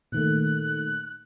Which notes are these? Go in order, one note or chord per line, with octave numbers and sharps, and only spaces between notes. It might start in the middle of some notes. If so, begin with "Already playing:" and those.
A#2 D#3 A3 F#6